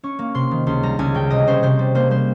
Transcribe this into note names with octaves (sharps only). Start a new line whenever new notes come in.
C#4 C#6
A#3
C3 C6
D#3
C#2 C6
G3 A#5
C#2 G#5
C#3 G5
C3 D#5
C#4 C5
C3 C5
G3
A#3 C5
G3 C5